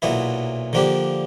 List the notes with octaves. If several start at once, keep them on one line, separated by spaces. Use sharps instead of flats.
B1 A#2 F#3 B3 E4
D3 F3 A#3 D4 G4